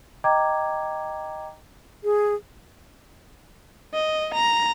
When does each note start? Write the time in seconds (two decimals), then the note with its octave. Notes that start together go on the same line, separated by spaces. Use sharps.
0.24 D#5 G5 A#5 D6 G#6
2.04 G#4
3.94 D#5
4.34 A#5